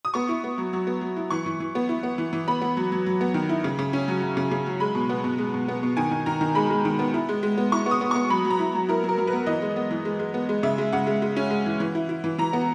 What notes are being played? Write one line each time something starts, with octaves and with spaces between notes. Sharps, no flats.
D#6
B3 C#6
E4
B3
F#3
F#3
B3
F#3
E4
E3 C#6
E3
E3
B3
E4
B3
E3
E3
B3 B5
B3
F#3
F#3
F#3
B3
D#3
E4
C#3
C#3
C#4
F#3
F#3
C#3
C#3
F#3
G#3 B5
B2
B3
B2
G#3
B2
B3
B2
D#3 G#5
D#3
D#3 A#5
D#3
G#3 B5
G#3
D#3
B3
E4
G#3
G#3
B3
E4 C#6
B3 D#6
B3
B3 C#6
F#3 B5
F#3
A#5
E4
F#3
E4 A#4
F#3
A#4
F#3
B4
B3
E3 D#5
G#3
B3
E3
G#3
G#3
B3
G#3
C#3 E5
G#3
C#3 F#5
G#3
G#3
C#4
G#3
E3
E3
E4
E4
E3
E3 A#5
B3